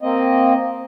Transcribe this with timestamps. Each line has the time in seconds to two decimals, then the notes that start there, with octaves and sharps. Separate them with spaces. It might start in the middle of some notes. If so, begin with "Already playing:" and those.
0.02 A#3 C4 D#5